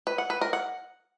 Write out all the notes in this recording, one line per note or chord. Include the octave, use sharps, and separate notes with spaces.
B4
F#5
B4
A#4
F#5